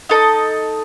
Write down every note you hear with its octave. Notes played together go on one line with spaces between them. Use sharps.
D#4 A4 D#5